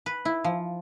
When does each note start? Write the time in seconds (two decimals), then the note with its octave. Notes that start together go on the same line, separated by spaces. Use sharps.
0.06 B4
0.25 E4
0.44 F3